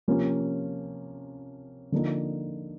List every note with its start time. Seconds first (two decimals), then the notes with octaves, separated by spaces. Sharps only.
0.08 C3 F3 A#3 C#4
1.92 D3 F3 A#3 D#4